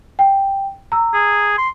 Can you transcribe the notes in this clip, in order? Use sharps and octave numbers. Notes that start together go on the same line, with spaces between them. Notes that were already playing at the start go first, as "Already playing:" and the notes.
G5
A#5 E6
G#4
C6